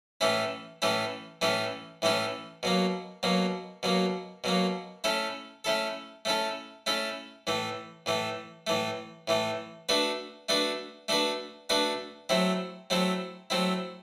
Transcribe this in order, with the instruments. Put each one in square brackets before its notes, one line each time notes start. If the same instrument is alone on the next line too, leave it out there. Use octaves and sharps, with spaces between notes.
[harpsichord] A2 E3 A3 C#4 E4
A2 E3 A3 C#4 E4
A2 E3 A3 C#4 E4
A2 E3 A3 C#4 E4
B2 F#3 A#3
B2 F#3 A#3
B2 F#3 A#3
B2 F#3 A#3
A3 C#4 E4 A4
A3 C#4 E4 A4
A3 C#4 E4 A4
A3 C#4 E4 A4
A2 E3 A3
A2 E3 A3
A2 E3 A3
A2 E3 A3
A3 D4 F#4 B4
A3 D4 F#4 B4
A3 D4 F#4 B4
A3 D4 F#4 B4
F#3 A3 C4 E4
F#3 A3 C4 E4
F#3 A3 C4 E4